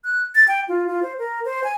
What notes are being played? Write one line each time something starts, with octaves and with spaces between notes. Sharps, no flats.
F#6
A6
G5
F4
F4
C5
A#4
C5
G#5